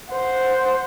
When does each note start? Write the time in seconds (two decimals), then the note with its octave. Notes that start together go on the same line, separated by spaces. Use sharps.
0.11 C5 F#5